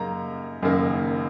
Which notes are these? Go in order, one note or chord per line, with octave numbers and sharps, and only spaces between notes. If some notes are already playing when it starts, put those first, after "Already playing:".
Already playing: F#2 C#3 A#3 D#4 A#5
F#1 F#2 D#3 A#3 D#4